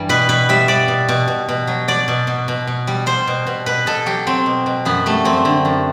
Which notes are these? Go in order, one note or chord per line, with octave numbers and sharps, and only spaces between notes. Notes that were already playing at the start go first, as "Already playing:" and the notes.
Already playing: G2 E3 G3
B2 B4
B2 B4
G3 E5
G3 D5
B2
B2
B2
B2
F#3
F#3 D5
B2
B2
B2
B2
G3
G3 C5
B2
B2
B2 B4
B2 A4
F#3 G4
F#3 C4
B2
B2
F#2 B3
G3 A3
F#2 C4
D3
F#2